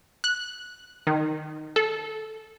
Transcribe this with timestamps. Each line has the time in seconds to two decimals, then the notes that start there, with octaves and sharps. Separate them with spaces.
0.24 F#6
1.07 D#3
1.76 A4